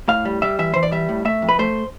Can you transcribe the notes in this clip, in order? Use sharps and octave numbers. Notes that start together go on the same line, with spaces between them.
A2 F5
G3
G3 E5
E3 E5
E3 C5
D5
G3 E5
A2
A3 E5
F2
B4
A3 C5